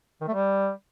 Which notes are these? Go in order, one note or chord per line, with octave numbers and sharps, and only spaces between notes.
D#3
A3
G3